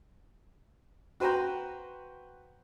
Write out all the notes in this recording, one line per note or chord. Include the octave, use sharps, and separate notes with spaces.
F#4 B4 C5 G5 A#5